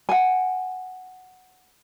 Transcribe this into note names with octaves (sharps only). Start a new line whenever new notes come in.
F#5 G#5